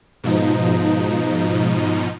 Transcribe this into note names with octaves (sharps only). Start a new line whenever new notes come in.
G#2 B2 F3 D#4